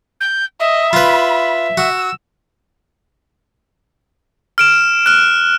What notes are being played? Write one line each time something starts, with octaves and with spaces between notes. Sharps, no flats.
G6
D#5 E5
F4 B4 B5
F#4 E6
F6 D7 E7
F6 F#6